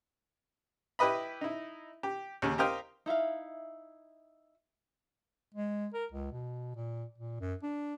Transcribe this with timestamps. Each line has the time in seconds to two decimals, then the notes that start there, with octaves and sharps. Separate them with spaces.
0.99 E4 G4 B4 D#5 B5
1.41 D#4 E4
2.03 G4
2.42 D#2 C#3 C#4
2.58 G4 A#4 C5 D#5 F5 G5
3.06 D#4 E4 E5 F5
5.54 G#3
5.94 A#4
6.12 C#2
6.32 B2
6.76 A#2
7.18 A#2
7.40 F#2
7.63 D4